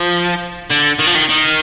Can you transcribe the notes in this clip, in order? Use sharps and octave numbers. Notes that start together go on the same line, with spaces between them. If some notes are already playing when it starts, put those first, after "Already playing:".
Already playing: F3
D3
D#3
F3
D#3
D#3